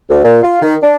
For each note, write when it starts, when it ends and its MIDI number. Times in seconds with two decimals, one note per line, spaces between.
0.09 0.20 38
0.24 0.40 46
0.43 0.58 65
0.62 0.75 51
0.82 0.96 62